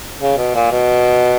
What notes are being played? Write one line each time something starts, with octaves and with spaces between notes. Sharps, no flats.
C#3
B2
A#2
B2